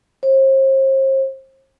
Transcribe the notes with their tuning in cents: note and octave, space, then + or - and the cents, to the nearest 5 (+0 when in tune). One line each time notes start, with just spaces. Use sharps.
C5 +40